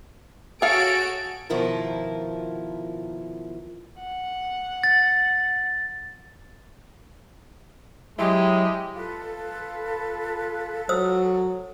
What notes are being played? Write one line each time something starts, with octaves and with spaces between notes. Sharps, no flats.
F#4 G#4 A4 C#5 F5 D7
B2 D#3 F3 E4 F4 A#4
F#5
A6
F#3 G#3 E4 G4 D#5
F4 A4 B4
F#3 C5 D#6 E6